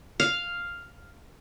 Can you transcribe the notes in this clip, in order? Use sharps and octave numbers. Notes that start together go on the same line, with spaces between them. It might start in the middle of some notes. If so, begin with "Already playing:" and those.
F5